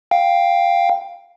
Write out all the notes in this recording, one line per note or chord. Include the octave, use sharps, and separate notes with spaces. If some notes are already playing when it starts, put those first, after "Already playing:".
F5 G5